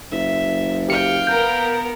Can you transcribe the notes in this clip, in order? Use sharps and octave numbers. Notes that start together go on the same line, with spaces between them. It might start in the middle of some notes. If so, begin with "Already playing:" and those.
F#1 E5
G4 F5 G5 C#7
B3 A#4 G6